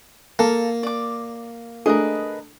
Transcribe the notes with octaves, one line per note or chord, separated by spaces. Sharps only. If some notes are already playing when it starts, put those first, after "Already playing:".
A#3 A4 F5 A#5
D5 D6
A3 D4 G#4 A#4 B4 D#5